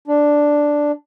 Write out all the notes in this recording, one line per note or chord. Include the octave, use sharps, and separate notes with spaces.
D4